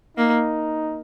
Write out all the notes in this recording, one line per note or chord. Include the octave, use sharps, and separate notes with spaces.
A#3 D#4